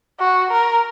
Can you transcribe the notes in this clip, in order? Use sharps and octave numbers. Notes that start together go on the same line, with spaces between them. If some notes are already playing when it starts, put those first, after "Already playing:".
F#4
A#4